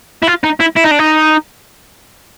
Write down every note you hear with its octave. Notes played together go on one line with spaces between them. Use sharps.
E4
F4
D#4
E4
E4
D#4
D4
D#4